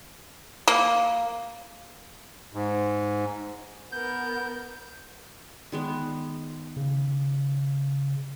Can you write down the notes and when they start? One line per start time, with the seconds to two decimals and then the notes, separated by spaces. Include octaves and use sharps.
0.68 A#3
2.53 G#2
3.92 B3 A#4 G6
5.72 D#3 G#3 B3
6.77 C#3